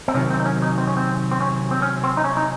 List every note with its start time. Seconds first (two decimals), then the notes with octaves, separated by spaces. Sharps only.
0.08 C4
0.14 C3 D#3 F#3 C#4
0.31 C4
0.40 D#4
0.46 C#4
0.62 D#4
0.78 C4
0.87 C#4
0.97 C4
1.32 C4
1.41 C#4
1.71 C4
1.82 C#4
2.04 C4
2.17 D#4
2.24 C#4
2.37 D#4